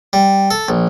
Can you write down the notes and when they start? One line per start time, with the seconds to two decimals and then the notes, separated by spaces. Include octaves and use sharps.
0.13 G3
0.51 A4
0.69 A#1